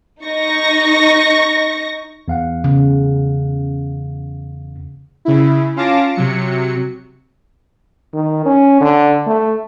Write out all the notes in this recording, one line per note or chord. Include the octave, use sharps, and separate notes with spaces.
D#4 C#6 A#6
E2 F5 F#5
C#3
C#3 E4
C#4 F4 F5 A5 D6 A#6
C3 F#3 C#7
D#3
C#4
D3
A3